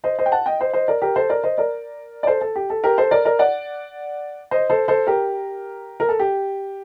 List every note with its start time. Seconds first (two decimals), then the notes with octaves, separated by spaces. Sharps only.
0.04 C5 D#5
0.19 C5 D#5
0.26 G5
0.32 F#5 A5
0.46 D#5 G5
0.59 C5 D#5
0.73 C5 D#5
0.88 A#4 D5
1.02 G4 A#4
1.16 A4 C5
1.30 A#4 D5
1.44 C5 D#5
1.58 A#4 D5
2.23 D5
2.27 A4 C5
2.41 A4
2.56 G4
2.70 A4
2.84 G4 A#4
2.98 A4 C5
3.11 A#4 D5
3.25 A#4 D5
3.39 D5 F#5
4.51 C5 D#5
4.70 A4 C5
4.88 A4 C5
5.07 G4 A#4
6.00 A#4
6.09 A4
6.19 G4